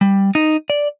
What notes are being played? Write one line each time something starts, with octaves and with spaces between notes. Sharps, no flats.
G3
D#4
D5